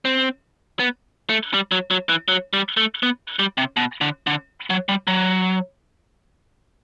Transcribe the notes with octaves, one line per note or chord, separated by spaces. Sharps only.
C4
B3
A3
G3
F#3
F#3
E3
F#3
G3
A3
B3
G3
C3
B2
D3
D3
F#3
G3
F#3